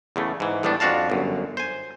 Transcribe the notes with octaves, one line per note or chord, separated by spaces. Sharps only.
E2 C#3 A3
G#2 E3
A2 E3 G3 B3 D4
F2 D4 F#4 F5 A5
G1 F#2
C5 G#5